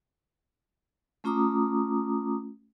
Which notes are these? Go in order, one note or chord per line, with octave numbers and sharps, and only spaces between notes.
A3 C#4 F4 A#5 D6 D#6